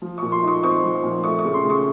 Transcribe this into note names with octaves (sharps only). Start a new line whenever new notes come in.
F3
A#2 C#6
C6
D#4 C#6
C4 C#6
F3
A#2
A3 C#6
C#6
C#3
C6
C#3 C#6